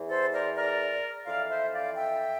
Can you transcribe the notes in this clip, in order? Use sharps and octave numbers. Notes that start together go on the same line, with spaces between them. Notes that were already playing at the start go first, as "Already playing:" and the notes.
Already playing: E2 E3
A4 C5
A#4 D5
A#4 D5
F2 E3 D5 F5
C5 E5
D5 F5
E5 G5